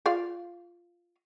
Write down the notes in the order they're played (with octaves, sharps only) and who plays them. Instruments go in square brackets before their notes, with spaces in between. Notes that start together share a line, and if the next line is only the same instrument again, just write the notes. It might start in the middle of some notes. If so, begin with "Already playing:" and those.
[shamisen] F4 D5 F5